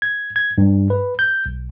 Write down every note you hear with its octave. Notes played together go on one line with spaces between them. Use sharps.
G#6
G#6
G2
B4
G6
B1